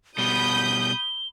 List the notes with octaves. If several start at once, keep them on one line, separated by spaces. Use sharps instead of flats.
B2 G3 B5 D#6 G6 G7